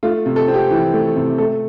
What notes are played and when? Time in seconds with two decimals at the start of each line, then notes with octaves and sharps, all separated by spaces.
0.03 A3 F4
0.26 C3
0.36 A4
0.48 C4
0.54 G4
0.71 E3
0.94 A3
1.16 C3
1.38 A3 A4